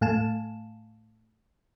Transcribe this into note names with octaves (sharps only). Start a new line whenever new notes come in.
A2 A3 F5 G#5 A5 E7